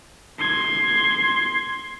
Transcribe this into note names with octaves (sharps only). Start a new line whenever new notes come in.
C6 G#6